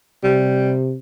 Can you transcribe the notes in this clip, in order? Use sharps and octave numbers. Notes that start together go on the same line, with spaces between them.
C3 G3